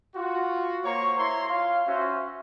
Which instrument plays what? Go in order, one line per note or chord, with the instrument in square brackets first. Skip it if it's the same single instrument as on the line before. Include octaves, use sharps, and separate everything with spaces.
[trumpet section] F4 F#4
A#3 C5 C#5 A#5 C#6
E4 C#5 A#5 C6
F4 C#5 F5
C#4 F#4 C5 E5